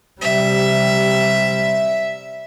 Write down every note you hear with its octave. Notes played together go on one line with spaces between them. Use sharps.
C3 G3 E5